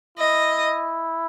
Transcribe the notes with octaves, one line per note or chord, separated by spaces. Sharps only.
E4 D#5